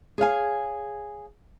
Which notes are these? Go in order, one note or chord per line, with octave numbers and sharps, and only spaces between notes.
G#4 C#5 F5 G#5